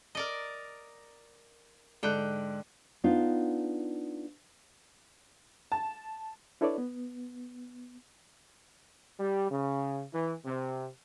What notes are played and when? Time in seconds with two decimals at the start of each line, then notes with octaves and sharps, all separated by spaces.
0.15 A#4 D5 D#5
2.03 G#2 D3 G5 F#6
3.04 B3 D4 D#4 F4
5.72 A5
6.61 D4 E4 A4 B4 C#5 D5
6.78 B3
9.20 G3
9.51 C#3
10.13 E3
10.45 C3